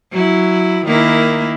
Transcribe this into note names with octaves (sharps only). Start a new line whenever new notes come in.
F#3 E4
D#3 A#3 E4